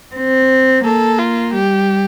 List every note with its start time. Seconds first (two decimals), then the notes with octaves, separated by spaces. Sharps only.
0.15 C4
0.85 A#3 A4
1.19 F4
1.52 G3 G4